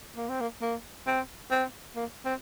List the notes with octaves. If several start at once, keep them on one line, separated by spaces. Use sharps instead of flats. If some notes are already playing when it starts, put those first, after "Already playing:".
A#3
C4
A#3
A#3
C4
C4
A#3
C4